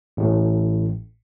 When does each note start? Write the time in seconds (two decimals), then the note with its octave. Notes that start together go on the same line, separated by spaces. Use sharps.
0.17 A1 A2